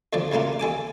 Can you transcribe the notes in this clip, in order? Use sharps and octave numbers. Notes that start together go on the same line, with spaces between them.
D2 D3 F3 D5
B1 C#3 A3 A#3 F4
D#2 A4 G#5 D6